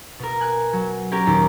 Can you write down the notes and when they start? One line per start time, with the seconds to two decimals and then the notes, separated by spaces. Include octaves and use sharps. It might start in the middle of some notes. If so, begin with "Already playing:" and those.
0.19 B2 A#4
0.40 G#5 F#6
0.73 F#3
1.12 C#4 G4 A#4
1.26 D#2 A#2